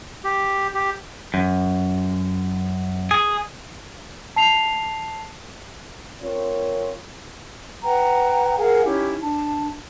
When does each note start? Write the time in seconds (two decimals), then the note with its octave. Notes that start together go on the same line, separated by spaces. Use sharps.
0.24 G4
0.75 G4
1.34 F#2
3.11 G#4
4.36 A5 C7 F7
6.22 C4 F4 A#4 C#5
7.83 B4 F#5 G5 A#5
8.58 G#4 A#4 F5 F#5
8.83 C#4 D#4 E4 G4
9.20 D4 A5